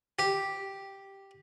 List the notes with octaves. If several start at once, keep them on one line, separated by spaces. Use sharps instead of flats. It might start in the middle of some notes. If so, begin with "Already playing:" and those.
G4